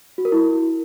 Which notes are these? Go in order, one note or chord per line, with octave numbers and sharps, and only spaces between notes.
F#4
A#4
E4